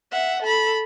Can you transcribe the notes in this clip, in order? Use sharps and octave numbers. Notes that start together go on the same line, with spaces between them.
E5 F#5
A4 B5